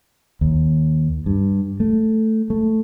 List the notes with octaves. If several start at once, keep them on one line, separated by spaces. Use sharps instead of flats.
D#2
G2
A3
A3